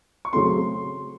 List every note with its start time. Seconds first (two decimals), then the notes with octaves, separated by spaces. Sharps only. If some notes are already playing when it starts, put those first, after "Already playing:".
0.25 C#6
0.33 C#3 F#3 A3 C4 C6